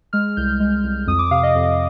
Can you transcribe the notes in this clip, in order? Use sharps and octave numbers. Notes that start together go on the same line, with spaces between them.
G#3 F6
C2 G6
G#3
C2
F2 D#6
D6
C3 F5
D#5
F2